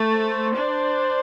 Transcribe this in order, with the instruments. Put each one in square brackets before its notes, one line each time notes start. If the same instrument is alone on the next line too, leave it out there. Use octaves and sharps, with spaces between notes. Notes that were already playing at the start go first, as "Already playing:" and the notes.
Already playing: [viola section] A3
[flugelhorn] C5
[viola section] D4